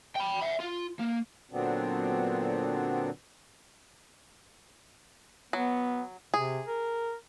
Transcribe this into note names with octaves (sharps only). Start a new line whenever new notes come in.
G5 B5
E5 F#5
F4
A#3
A#2 D3 F#3 B3 C4 D4
F#3 B3
C3 G#4
A#4